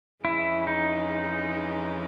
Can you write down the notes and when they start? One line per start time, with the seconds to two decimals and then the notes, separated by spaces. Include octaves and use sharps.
0.25 F2 C#3 E3 G#3 E4
0.67 D#4